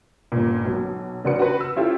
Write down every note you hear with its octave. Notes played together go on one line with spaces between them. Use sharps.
G1 A#2
B1 F#3
A1 C#3 D4 F#4 B4 C#7
F#4 B4
E6
C#4 E4 F4 G4 A4